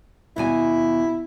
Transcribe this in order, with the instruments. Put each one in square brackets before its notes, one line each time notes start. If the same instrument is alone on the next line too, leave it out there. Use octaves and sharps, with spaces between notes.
[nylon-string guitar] D#2 B2 G#5 [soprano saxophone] E4